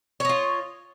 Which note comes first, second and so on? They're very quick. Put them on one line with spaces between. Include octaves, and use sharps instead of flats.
C#5 D#5 F4